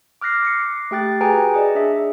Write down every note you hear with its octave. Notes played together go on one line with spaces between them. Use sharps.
D6 F6 F#6 A#6 C7
D6 C7 C#7
A3 G4 G5 F#6 A6
F#4 G#4 B4 G5 G#5 A#5
G#4 D5 D#5
D4 G#4 E5